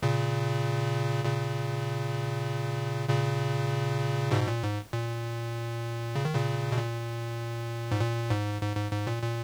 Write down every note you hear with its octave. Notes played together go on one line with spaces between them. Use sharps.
A#2 C#3
A#2 C#3
A#2 C#3
G#2 B2
A#2
G#2
A#2
C#3
D#3
A#2 C#3
B2
A#2
G#2
A#2
G#2
G#2
G#2
G#2
A#2
A#2